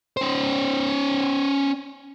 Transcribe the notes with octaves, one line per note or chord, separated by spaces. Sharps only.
C#4 C5